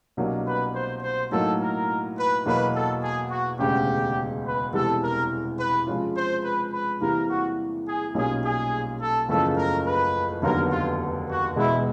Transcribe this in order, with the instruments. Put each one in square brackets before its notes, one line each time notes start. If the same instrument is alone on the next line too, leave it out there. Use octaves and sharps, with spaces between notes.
[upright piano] C2 B2 F#3 A#3 D4
[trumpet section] B4
C5
C5
[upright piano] A2 F#3 A#3 D#4 [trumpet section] A4
[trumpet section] A#4
B4
[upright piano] E2 B2 F#3 A#3 [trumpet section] B4
[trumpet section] A4
G#4
F#4
[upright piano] E1 D2 C#3 [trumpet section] G4
[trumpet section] B4
[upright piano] E1 E2 C3 E3 G3 [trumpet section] A4
[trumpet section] A#4
B4
[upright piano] C3 F3 G#3 C#4 F4
[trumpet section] C5
B4
B4
[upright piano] E2 C3 E3 G3 A#3 [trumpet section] A#4
[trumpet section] F#4
G#4
[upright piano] B1 A#2 G3 A#3 C#4 [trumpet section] G#4
[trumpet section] G#4
A4
[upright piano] F#1 E2 C#3 F3 A3 [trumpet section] A4
[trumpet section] A#4
B4
[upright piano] F1 D#2 D3 F#3 B3 [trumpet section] A#4
[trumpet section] F4
F#4
[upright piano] E1 E2 B2 G#3 [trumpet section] E4